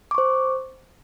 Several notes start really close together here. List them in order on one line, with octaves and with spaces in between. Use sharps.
D6 C#6 C5